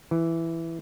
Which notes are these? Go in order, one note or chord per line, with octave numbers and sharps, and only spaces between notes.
E3